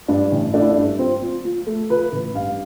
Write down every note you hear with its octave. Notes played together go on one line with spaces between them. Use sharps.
G2 D4
A1
A3 D4
E4
D4
G2
F3 C4
F3
F3
A3
F3 B4
A1
G2 F5